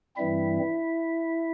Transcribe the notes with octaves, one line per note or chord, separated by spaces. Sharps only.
G2 E3 G3 C4 E4 E5